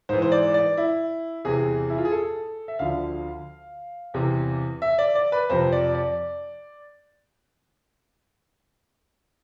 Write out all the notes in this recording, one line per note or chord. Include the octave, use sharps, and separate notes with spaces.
G#2 E3 C5
C5
D5
D5
E4
E2 C3 E3 G#4
E4
F4
G#4
A4
E5
D2 D3 F3 F5
E2 C3 E3
E5
D5
D5
B4
F2 C3 F3 C5
D5
D5